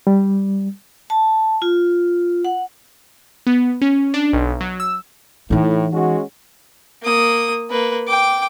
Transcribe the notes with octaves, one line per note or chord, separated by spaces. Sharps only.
G3
A5
F4
F#5
B3
C#4
D4
B1
F#3
E6
A2 E3 D#4
G#3 C#4 F#4
A#3 D#6
A#3 B4
G5 D6